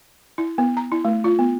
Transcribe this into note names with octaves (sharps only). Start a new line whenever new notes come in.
E4
B3
A#5
E4
A3
F4
B3